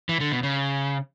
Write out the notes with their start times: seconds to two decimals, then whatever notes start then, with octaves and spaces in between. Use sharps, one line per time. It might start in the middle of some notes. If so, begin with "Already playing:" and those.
0.09 E3
0.20 D3
0.32 B2
0.43 C#3